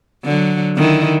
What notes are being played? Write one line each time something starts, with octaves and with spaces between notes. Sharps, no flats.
D3 F#3
D3 D#3 E4